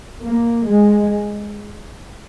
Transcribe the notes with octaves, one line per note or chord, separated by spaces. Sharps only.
A#3
G#3